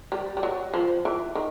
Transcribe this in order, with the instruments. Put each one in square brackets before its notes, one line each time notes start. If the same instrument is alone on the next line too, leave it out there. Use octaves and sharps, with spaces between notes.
[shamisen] G3
G3
F#3
F3
E3
D#3